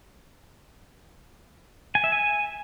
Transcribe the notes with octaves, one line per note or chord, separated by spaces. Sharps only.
G#5
E5
G#5